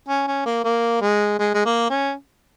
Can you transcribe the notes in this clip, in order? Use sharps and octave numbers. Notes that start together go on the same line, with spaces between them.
C#4
C#4
A#3
A#3
G#3
G#3
G#3
A#3
C#4